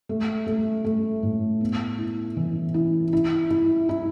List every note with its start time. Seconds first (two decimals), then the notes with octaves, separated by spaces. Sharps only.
0.09 A3
0.47 A3
0.85 A3
1.23 A2
1.61 B3
1.98 E4
2.37 E3
2.74 E4
3.13 E4
3.51 E4
3.89 E4